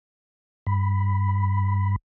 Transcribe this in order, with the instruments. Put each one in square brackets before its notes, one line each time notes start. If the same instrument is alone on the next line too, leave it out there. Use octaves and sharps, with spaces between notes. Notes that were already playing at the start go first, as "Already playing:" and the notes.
[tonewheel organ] G2 B5